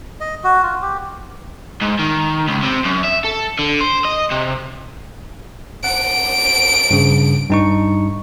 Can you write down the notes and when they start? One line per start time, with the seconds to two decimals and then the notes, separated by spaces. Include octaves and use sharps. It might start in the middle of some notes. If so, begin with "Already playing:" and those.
0.21 D#5
0.44 F#4
0.63 F4
0.82 G4
1.82 G#2
1.99 D#3
2.48 C#2
2.63 C3
2.85 F#2
3.04 E5
3.24 A4
3.59 D3
3.81 C5
4.05 D#5
4.31 C3
5.84 F#5 D7
6.91 G2 C#3
7.50 G2 D#4 C#6